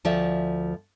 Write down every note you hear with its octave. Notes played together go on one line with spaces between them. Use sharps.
D2 F3 D5 E5